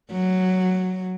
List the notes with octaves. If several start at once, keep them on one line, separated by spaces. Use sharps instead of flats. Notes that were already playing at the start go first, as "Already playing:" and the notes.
F#3